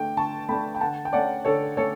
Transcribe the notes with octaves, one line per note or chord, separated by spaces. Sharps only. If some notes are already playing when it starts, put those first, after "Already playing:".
Already playing: D3 A3 D4 G5
D3 A5 C#6
A3 D4 G5 B5
G5
D3 F#5 A5
G5
A3 C#4 D5 F#5
D3 A4 C#5
A3 C#4 A4 C#5